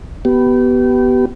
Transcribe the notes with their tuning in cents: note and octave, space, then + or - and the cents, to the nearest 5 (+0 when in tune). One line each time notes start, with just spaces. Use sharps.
B3 +0 G4 -30